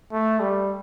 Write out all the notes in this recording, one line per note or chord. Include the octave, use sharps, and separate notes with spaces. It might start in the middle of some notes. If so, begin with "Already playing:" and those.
A3
G3